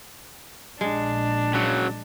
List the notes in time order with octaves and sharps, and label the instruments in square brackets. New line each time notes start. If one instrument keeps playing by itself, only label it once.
[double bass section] A#1 [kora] G#3 [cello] D4
[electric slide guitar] C#3 F#3